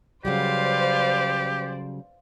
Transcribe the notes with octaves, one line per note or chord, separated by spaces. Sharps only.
C#3 F#3 G3 G4 B4 C5 D5 F5